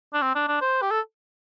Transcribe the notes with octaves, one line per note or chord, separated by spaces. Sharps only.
D4
C4
D4
D4
C5
G4
A4